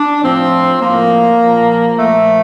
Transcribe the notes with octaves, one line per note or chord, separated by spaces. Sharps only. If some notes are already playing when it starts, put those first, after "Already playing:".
Already playing: D4
A2 F3 C4
A2 F3 A#3
A#2 F3
A#2 F3 A3